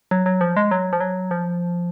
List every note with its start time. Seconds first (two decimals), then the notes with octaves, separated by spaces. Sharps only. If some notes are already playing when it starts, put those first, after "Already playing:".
0.11 F#3
0.26 F#3
0.41 F3
0.56 G#3
0.71 F#3
0.93 F3
1.00 F#3
1.31 F3